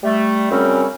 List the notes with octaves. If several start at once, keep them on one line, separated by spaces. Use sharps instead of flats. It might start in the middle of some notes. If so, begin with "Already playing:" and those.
G3 A3
F#2 C#3 G3 C4 C#4